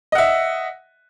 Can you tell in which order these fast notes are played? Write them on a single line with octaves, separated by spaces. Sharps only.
D#5 F#5 E5